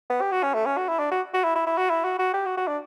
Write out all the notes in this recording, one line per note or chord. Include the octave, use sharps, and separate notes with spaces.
B3
G4
F#4
C#4
A3
C#4
F#4
E4
D4
F#4
F#4
E4
E4
E4
F#4
E4
F#4
F#4
G4
F#4
F#4
D4